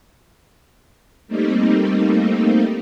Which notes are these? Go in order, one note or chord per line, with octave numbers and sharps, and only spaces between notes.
G3 A3 A#3 C4 D#4